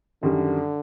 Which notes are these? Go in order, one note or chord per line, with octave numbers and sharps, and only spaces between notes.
F#2 D3 D#3 G3